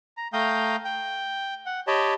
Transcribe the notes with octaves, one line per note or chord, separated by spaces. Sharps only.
A#5
A3 F5 G5 A#5 D#6 G6
G5
F#5
G4 C#5 D#5 G5 A5 B5